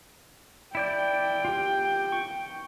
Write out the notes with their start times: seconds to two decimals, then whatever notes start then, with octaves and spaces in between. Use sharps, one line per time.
0.75 E4 D5 G5 G6
1.45 F4 G4
2.12 C#6